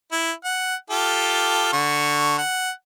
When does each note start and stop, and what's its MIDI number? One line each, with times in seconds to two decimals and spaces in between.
0.12 0.32 64
0.45 0.75 78
0.90 1.71 65
0.90 1.71 67
0.90 1.71 69
1.73 2.38 50
1.73 2.38 85
2.38 2.70 78